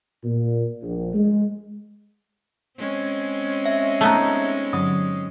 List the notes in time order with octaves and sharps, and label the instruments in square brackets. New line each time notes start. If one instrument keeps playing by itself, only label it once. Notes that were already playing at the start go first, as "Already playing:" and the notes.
[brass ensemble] A#2
A#1
G#3
[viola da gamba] G#3 C4 C#4
[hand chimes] E5
[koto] A3 B3 D#4
[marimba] G2 D3 F#3 [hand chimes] D#6